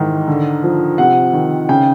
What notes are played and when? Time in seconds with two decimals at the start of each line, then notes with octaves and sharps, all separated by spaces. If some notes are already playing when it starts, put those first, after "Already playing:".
Already playing: G#2 D#3 E3
0.28 D3
0.63 F3
0.98 C3 F#5
1.33 D#3
1.69 C#3 G5